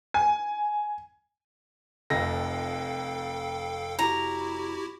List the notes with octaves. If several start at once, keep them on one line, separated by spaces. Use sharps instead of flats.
G#5
F1 F2 A4 F5 G5 A#6
E4 F#4 G4 A#5